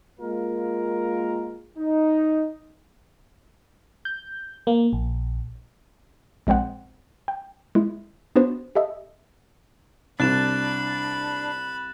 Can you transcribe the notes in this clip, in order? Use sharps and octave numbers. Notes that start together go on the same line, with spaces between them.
G#3 A#3 F4 A#4
D#4
G6
A#3
A#1
A#1 G#3 C4 C5 F#5
G5
G#3 E4
B3 D4 F#4 B4 C5
G4 A4 D#5 E5
C2 D4 B5 F#6 A6 E7